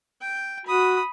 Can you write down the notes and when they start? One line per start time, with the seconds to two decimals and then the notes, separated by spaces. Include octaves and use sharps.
0.21 G5
0.66 F#4 B5 D#6